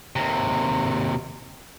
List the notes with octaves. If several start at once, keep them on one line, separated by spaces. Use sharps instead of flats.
D#2 C3